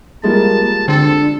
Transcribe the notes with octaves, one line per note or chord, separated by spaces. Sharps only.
F3 G3 G#3 A#3 A5
D3 C4 D4 A4